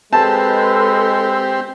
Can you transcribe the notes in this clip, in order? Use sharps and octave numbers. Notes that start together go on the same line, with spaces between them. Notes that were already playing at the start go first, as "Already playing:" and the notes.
G#3 C4 G4 A4 B4 A5 E6